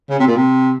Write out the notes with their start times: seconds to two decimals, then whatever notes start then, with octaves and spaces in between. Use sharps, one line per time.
0.10 C#3
0.19 C3
0.27 A#2
0.36 C3